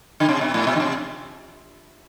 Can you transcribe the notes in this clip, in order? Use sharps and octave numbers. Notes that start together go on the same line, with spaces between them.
D3
C3
B2
A2
B2
D3
C3